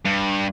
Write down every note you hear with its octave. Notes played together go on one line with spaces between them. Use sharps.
G2